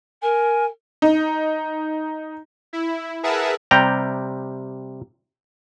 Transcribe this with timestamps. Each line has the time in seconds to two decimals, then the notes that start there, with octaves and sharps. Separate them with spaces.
0.22 A#4 G#5
1.02 D#4
2.73 E4
3.23 G#4 A#4 B4 E5 F#5 A5
3.71 C3 G3 G5 A#5